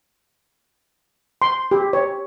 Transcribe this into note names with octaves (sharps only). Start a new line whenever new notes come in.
C6
G4
C#5